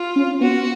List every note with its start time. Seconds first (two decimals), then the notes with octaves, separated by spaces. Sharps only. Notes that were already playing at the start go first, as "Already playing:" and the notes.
Already playing: F4
0.16 C#4
0.41 B3 F#4